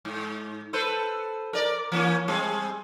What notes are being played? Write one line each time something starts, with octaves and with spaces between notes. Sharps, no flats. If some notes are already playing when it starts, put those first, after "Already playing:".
G#2
A4 B4 C5
A#4 D5
E3 A#3 C#4
G3 C4 G#4